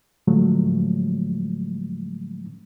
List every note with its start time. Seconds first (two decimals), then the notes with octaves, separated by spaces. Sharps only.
0.27 A2 D3 F3 F#3 G#3 A3